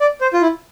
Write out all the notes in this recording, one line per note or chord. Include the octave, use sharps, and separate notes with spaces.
D5
C5
F4
E4